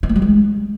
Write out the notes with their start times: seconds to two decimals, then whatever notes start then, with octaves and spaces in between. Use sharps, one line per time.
0.03 D#4
0.09 A#3
0.16 G3
0.22 G#3